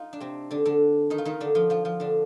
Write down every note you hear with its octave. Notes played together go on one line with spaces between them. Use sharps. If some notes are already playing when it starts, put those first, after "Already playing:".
Already playing: D#4 F4
D4
C3 C4
D3 D4
D3 D4
D#3 D#4
F4
D#3 D#4
D3 D4
F3 F4
F3 F4
F3 F4
D3 D4